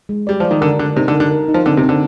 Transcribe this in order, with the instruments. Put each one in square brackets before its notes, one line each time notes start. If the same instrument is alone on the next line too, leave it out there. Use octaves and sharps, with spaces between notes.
[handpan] G#3
[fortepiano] G3 [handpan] D5
[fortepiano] F3 [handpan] D5
[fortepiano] D#3
[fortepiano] D3 [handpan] A#4
[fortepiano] D3 [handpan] A#4
[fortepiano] C3 [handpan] D#4
[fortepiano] D3
[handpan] A#4
[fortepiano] D3
[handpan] A#4
D#4
[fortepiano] F3
[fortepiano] D3 [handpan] C4
[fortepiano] C3
[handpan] C4
[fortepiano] D3